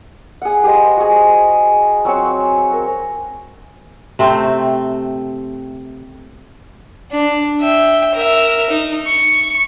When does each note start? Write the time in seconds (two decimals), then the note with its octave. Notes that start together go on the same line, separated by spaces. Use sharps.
0.42 G#4 F#5
0.64 G4 B4 C5 D#5
0.97 F#4 G#4
2.05 F#3 C4 C#5 G#5
2.72 A#4
4.19 C3 A3 C4
7.12 D4
7.61 E5 G5
8.14 A#4 E5
8.70 D#4
9.06 C#6